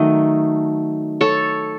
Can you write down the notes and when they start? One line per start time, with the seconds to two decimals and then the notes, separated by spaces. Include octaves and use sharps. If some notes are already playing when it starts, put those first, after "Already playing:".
Already playing: D#3 F#3 A3 D#5
1.21 A4 C#5